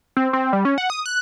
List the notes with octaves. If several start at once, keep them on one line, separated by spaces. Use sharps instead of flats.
C4
C4
G3
C#4
F#5
D#6
F#6